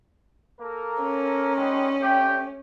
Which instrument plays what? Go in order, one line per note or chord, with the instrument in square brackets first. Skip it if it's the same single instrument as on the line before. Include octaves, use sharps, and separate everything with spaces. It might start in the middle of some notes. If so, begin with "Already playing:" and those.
[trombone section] A#3 A4 A#4
[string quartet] C#4
[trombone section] D#3 G3 G#3
G2 A3 G4